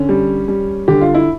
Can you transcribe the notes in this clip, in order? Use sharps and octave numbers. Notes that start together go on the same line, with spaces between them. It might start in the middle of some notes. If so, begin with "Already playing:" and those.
Already playing: D3 C#4
G3
G3
D3 G4
F4
E4